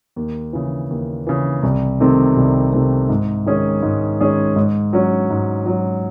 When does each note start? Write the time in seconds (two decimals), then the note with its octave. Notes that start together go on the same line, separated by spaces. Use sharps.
0.16 D#2
0.53 C#3 E3
0.90 D#2
1.27 C#3 E3
1.63 C2
2.00 C3 D#3 A3 C4
2.37 C2
2.73 C3 D#3 A3 C4
3.09 G#2
3.46 D#3 G#3 C#4 G#4
3.83 G#2
4.20 D#3 G#3 C#4 G#4
4.56 G#2
4.93 F#3 C#4
5.30 G#2
5.66 F#3 C#4